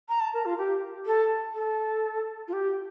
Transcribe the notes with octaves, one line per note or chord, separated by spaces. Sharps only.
A#5
A5
A#4
F4
G4
A4
A4
F4
G4